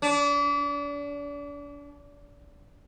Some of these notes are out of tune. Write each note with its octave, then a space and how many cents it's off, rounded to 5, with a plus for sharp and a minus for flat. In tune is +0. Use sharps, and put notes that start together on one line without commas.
D4 -35